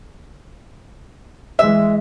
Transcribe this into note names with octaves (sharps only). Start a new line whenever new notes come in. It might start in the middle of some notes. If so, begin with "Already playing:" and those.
E3 G#3 E5